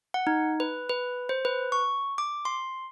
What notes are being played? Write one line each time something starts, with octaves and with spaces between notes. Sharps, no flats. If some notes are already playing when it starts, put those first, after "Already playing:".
F#5
D#4
B4
B4
C5
B4
C#6
D6
C6